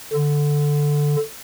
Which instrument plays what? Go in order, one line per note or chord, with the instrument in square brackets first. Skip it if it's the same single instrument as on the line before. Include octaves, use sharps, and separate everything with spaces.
[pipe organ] D3